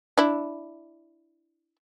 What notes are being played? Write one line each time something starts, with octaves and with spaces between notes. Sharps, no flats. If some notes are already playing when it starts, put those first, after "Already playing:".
D4 E4